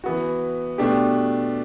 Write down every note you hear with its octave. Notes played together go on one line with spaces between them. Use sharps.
E3 B3 F#4
B2 A3 D4 G4